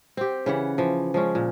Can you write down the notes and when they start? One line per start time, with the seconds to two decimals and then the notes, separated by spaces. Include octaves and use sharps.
0.17 C4 G4
0.46 C#3 E3 F#5
0.78 E3 F3
1.14 F3 G#3 C#4
1.35 A#2